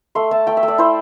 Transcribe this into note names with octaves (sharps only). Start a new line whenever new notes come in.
A3 C6
A3 A5
A3 G5
E5
A3
D5
E4 C5